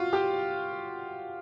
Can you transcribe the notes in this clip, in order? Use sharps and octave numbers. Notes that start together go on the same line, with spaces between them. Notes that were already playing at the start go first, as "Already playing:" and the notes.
Already playing: F4 F#4
G4